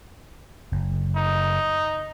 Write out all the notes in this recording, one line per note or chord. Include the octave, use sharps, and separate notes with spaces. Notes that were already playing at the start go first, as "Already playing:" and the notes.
F#1
D#4